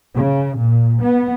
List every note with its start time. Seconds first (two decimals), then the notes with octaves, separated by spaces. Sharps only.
0.15 C#3
0.57 A#2
1.02 B3